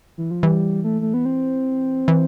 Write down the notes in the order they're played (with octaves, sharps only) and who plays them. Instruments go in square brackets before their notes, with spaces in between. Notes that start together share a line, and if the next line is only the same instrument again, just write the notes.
[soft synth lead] E3
F3
[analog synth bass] E3 [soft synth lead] G3
[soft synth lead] A3
A3
B3
C4
[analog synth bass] E3